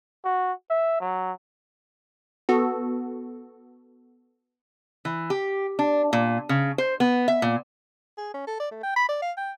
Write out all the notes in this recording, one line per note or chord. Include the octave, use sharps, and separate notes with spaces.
F#4
E5
F#3
B3 F#4 A4
E3
G4
D4
A#2
C#3
C5
B3
E5
A#2
G#4
C#4
A4
D5
A3
G5
B5
D5
F5
G5